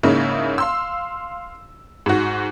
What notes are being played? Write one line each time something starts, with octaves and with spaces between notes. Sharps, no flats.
G#2 C#3 A#3 D#4 E4
F5 C6 E6
G#2 F#4